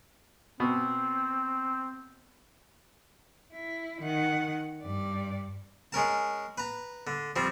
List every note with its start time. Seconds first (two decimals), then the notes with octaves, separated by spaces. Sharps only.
0.60 B2 C4
3.53 E4
4.01 D#3 F#5
4.83 G2 D5
5.92 G#3 C#4 A#4 A5
6.58 B4 A#5
7.07 D3
7.36 F3 G3 C4